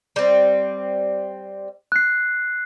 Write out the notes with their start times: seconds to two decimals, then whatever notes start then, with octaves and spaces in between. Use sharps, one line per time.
0.16 G3 C4
1.92 F#6 C7